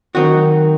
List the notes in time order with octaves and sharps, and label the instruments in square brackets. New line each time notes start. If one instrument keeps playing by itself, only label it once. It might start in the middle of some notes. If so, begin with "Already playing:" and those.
[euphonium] D#3 [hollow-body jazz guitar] F#3 C4 D#4 F#4